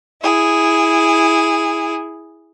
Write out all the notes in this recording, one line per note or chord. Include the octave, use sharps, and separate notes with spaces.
E4 G#4